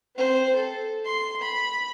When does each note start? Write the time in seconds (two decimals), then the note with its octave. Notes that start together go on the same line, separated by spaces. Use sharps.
0.17 C4 C5
0.55 A4
1.05 C6
1.41 B5